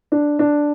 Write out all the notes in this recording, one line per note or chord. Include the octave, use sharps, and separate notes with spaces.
D4
D4